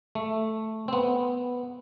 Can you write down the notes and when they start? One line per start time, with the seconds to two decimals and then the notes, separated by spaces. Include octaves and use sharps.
0.15 A3
0.88 C4
0.93 B3